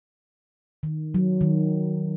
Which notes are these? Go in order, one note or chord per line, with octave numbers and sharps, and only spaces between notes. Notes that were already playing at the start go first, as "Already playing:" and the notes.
D#3
F#3
D#3